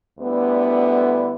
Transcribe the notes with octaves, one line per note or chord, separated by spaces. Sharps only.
D2 D3 G3 B3 E4